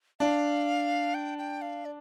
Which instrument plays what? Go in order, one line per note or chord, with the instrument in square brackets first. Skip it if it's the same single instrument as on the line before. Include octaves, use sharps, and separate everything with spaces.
[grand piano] D4 [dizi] F5
[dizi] G5
G5
F5
D5